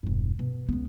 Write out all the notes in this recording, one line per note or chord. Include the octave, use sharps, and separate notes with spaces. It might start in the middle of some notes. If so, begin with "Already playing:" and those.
E1 G2
B2
C#2 B3